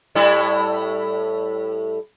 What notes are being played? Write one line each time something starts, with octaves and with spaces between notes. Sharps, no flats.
A2 G3 E4